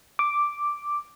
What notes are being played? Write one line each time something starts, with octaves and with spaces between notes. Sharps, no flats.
D6